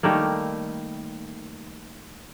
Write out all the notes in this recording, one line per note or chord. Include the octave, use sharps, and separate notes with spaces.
D#3 G3 A3 A#3